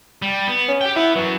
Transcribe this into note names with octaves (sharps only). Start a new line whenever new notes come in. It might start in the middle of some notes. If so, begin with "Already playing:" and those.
G3
B3
C#4
G4 G5
E4 F#5 B5
F#2 E3 F#3